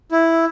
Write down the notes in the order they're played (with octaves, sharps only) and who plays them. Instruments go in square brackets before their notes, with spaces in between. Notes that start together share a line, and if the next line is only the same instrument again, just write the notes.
[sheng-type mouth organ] E4